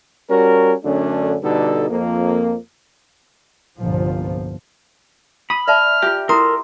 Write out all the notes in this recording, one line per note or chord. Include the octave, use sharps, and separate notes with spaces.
G3 C#4 F#4 A#4
F#2 D3 A3 C#4 D4
B2 D3 G3 D#4 A4
F2 A#3
G1 C2 A#2 F3
B5 D#6
D5 E5 A5 F6
F4 G4 E5
E4 A4 A#4 A#5 C6 D#6